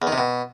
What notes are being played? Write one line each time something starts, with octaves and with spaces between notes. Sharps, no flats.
E2
D#3
C3
B2